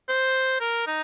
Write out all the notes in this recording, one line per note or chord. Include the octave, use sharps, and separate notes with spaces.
C5
A#4
D#4